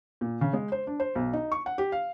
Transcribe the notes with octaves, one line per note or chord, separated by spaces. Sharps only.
A#2
C#3
G#3
C5
D4
C5
B1
D#4
C#6
F#5
G4
F5